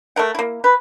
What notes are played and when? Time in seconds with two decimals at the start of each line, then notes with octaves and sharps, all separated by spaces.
0.16 A3 A4 A#4 F#5
0.35 A#3 E4
0.64 B4